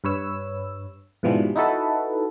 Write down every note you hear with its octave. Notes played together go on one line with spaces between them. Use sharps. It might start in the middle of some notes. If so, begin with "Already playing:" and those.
G2 B4 C#5 E6
G#2 B2 E3 F3 G3
D#4 E4 F#4 A4 B4